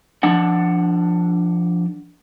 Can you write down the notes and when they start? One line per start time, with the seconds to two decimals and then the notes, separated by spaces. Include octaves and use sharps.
0.23 F3 D4 F#5